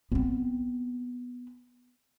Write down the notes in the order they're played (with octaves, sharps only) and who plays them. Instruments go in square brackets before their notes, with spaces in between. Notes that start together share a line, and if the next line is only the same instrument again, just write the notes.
[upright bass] B3 C4